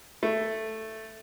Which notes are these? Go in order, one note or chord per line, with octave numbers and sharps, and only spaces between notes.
A3